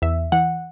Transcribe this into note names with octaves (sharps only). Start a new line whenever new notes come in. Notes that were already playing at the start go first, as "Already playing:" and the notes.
E2 E5
E3 F#5